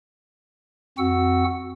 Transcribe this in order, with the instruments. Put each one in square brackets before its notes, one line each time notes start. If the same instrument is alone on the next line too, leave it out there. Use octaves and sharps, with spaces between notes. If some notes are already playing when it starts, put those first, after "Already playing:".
[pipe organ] F2 C4 F#4 F#5 E6